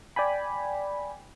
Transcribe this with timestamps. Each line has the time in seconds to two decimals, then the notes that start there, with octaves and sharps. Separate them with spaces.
0.16 D5 G5 G#5 B5